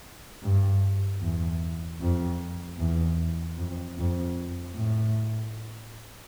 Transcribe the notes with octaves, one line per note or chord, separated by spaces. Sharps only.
G2
E2
F2
E2
F2
F2
A2